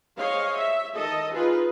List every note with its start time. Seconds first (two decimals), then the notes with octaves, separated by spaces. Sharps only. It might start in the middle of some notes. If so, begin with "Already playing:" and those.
0.18 G#4 C5 C#5 D#5 F5
0.58 E5
0.96 D#3 A4 D#5
1.34 D#4 F4 G#4 B4